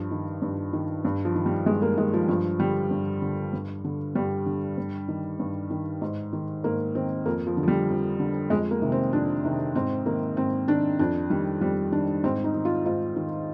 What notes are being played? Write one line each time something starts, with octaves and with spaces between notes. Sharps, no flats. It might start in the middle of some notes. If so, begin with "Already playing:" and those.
Already playing: G2 F3
D#3
G2
D#3
G2
F3
D#3
G3
G2 G#3
A#3
D#3 G#3
F3
G2 F3
D3 G3
G2
D3
G2
D3
G2 G3
D3
G2
D#3
G2
D#3
G#2
D#3
G#2 A#3
D#3 C4
F2 A#3
F3
D3
F3
G3
F2
D3
F2 G#3
A#3
C3 D#3
C4
F2 D4
C3 D#3
G#2 C4
D#3 A#3
G#2 C4
D#3 D4
F2 D4
D#3 G3
F2 G3
D#3 D4
G#2 C4
D#4
D#3
F4
G#2 F4
D#3